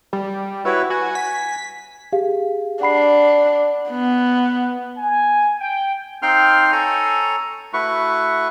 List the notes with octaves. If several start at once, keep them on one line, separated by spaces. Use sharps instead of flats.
G3
E4 F#4 B4 C#5
F#4 G#5
B6
G4 G#4 F5
D4 F#5 B5 C7
B3
G#5
G5
C4 D#4 F5 G5 C6 F6
A4 C#5 G#5 A#5
A3 E4 F#4 B4 C#6